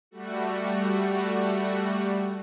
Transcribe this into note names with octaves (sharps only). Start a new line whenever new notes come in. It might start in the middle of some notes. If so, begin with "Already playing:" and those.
G3 A3 F#4